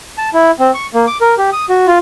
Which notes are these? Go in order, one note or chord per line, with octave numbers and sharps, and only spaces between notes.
A5
E4
C4
C#6
A#3
D6
A#4
G4
D#6
F#4
F4